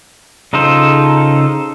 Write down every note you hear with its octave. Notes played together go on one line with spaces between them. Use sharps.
C#3 D#4 F4 A4 C5